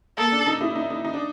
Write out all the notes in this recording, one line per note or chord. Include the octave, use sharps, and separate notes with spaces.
A#3 A4
D4
D#4
E4
D#4
D#4
D#4
D4